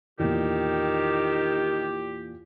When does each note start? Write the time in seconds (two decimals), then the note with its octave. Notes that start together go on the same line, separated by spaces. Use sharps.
0.19 E2 A#2 D#3 G4